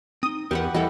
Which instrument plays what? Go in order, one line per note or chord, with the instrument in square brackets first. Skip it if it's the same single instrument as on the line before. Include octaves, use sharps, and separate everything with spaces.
[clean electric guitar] C4 D#4 [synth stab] D#6
[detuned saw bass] E2 [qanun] G4 B4 F#5 [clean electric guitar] A#4
[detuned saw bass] E3 [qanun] G3 E4 A4 [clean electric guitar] D#5 F#5